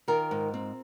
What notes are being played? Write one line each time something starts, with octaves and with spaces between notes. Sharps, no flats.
D#3 F4 A#4
G#2
C4